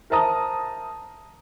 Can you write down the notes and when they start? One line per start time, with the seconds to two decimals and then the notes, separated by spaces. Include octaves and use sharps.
0.10 A#4 C5 E5 A5 A#5 D#6